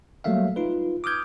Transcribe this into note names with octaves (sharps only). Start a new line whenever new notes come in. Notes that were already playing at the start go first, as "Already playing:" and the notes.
F#3 G3 A3 A#3 E5 F5
D#4 F4 B4
D6 D#6 F6 G6 G#6